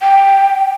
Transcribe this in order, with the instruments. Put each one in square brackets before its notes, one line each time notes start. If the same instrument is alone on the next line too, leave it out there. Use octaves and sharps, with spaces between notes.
[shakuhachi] G5